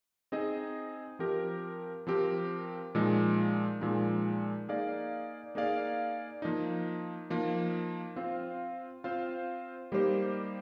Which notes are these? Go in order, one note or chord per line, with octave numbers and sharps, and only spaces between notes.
C4 D#4 G#4 D#5
F3 C4 G4 A#4
F3 C4 G4 A#4
A#2 F3 G#3 D#4
A#2 F3 G#3 D#4
A#3 D#4 G#4 D5 F5
A#3 D#4 G#4 D5 F5
F3 A#3 D#4
F3 A#3 D#4
C4 F4 C5 F5
C4 F4 C5 F5
G3 A#3 D#4 G4 C5